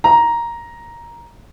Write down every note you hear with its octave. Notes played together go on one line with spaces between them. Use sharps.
A#5